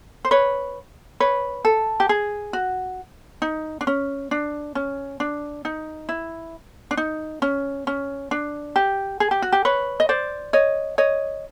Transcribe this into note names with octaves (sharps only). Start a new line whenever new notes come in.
C5
B4 C#5
B4 C#5
A4
G4
G#4
F#4
D#4
D4
C#4
D4
C#4
D4
D#4
E4
D4
D#4
C#4
C#4
D4
G4
G#4
G4
F#4
G4
B4 C#5
D#5
C5 D5
C#5 D#5
C#5 D#5